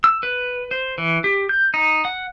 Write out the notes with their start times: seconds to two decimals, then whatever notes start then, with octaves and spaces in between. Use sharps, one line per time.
0.04 E6
0.23 B4
0.71 C5
0.98 E3
1.24 G4
1.49 G6
1.74 D#4
2.05 F#5